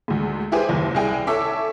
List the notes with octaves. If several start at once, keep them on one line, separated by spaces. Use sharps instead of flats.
D2 G#2
E4 G4 G#4 B4 C5
F#1 D#2
C2 E4 G#4 G5
A4 C#5 E5 D6